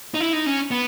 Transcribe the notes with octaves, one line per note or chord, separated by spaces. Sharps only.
D#4
E4
D#4
C#4
B3